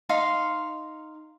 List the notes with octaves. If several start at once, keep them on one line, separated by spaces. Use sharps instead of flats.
D#4 F5 C6